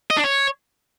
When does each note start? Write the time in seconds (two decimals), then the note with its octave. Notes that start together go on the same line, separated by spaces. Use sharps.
0.11 D#5
0.17 D4
0.24 C#5